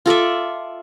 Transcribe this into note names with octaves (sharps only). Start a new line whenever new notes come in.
F4 A4 D5 E5